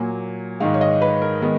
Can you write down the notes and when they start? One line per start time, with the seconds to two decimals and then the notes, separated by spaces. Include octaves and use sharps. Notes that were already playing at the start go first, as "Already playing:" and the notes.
Already playing: A#2 F#3 A#3 G#5
0.60 G#2 D#3 G#3 F5
0.74 C#5
0.81 D#5
1.01 B4
1.22 A#4
1.42 D#3 G#3 B3